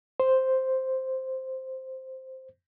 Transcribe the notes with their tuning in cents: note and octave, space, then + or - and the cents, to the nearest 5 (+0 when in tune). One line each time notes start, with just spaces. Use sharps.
C5 +0